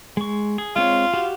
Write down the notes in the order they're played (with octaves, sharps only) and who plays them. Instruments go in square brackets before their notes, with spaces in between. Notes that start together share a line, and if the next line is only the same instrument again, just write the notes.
[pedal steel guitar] G#3 C#6
G#4
[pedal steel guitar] G#3 C4 C#5 [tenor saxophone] F4
[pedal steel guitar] F#4 G4 F5